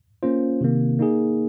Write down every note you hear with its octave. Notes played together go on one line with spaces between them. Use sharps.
A#3 C#4 F4 C5
C3 D#3 A#3
A#3 D#4 G#4